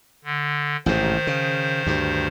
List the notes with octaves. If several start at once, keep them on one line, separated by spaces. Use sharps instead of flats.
D3
A1 G#2 C3 D#3 C5
C#3
D2 G2